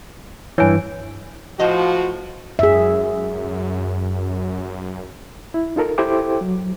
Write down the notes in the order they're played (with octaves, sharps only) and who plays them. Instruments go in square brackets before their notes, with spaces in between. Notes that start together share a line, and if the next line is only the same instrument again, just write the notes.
[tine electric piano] G2 E3 [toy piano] C#5 G#5
[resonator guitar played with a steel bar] A2 C5 D#5 [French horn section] F3 F#4
[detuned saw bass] F#2 [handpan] G#4 E5
[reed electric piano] E4
D#4 F4 A4 A#4
E4 G4 A4 C5 G5 D6
F#3